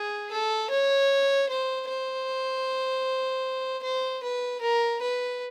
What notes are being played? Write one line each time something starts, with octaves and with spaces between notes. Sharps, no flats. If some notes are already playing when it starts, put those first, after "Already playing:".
Already playing: G#4
A4
C#5
C5
C5
C5
B4
A#4
B4